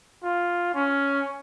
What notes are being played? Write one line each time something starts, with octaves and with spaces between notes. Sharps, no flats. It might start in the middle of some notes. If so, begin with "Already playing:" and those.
F4
C#4